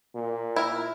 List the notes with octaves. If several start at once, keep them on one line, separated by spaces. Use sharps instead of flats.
A#2
E4 A#4